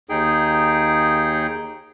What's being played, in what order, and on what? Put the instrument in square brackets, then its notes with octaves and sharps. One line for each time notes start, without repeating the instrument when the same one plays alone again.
[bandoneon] D#2 D#4 G#4 G5